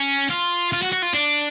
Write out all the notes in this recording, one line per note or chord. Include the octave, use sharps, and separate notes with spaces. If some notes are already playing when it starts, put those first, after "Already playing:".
Already playing: C#4
F4
F4
F#4
F#4
F4
D4